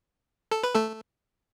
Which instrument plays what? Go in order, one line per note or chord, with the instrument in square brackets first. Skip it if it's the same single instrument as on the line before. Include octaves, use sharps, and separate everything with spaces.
[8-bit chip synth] A4
B4
A3 A4